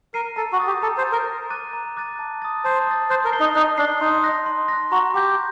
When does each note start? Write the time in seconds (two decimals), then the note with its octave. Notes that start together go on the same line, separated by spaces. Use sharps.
0.14 A#4 C7 D#7
0.36 A4 A#5
0.52 F#4
0.59 D#6 A6
0.67 G4
0.82 A4 A#5
0.98 C5
1.05 D#6 A6
1.12 A#4
1.27 A#5
1.50 D6 F#6 A6 D#7
1.73 A#5
1.97 D6 F#6 A6 D#7
2.19 A5
2.42 D#6 A6
2.65 C5 A5
2.87 D#6 A6
3.10 C5 F#6
3.25 A#4
3.32 C7 G7
3.40 D#4
3.55 D#4 F#6
3.78 D4 C7 G7
4.01 D#4 C6
4.23 F#6 A#6
4.46 C6
4.68 F#6 A#6
4.92 F#4 A#5
5.14 G4 D6 G6